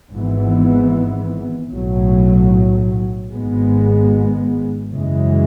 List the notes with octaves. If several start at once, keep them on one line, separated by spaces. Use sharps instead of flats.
G#1 G#2 E3 B3
B1 A2 F#3
G#1 G#2 G#3 B3
F#2 C#3 E3 G#3